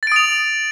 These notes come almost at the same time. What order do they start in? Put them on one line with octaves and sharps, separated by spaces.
A6 D7 D#6 F7